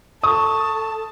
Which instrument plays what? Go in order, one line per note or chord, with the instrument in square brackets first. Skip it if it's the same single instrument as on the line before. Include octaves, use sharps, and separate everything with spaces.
[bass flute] A4 [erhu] A5 [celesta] C#6 [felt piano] D#6